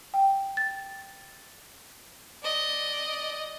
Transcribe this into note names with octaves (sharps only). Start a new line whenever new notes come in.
G5
A6
D5 D#5